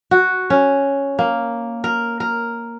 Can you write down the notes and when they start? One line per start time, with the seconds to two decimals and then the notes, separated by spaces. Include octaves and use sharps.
0.11 F#4
0.50 C#4
1.19 A#3
1.84 A#4
2.20 A#4